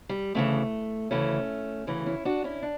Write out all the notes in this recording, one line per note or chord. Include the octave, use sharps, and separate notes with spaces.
G3
D2 C#3 E3 A3
D2 C#3 E3 A3 C#4
D2 C#3 E3 A3 C#4
C#4 E4
D4 F#4
C#4 E4
D4